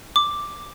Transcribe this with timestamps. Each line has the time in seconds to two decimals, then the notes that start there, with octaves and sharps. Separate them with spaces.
0.16 D6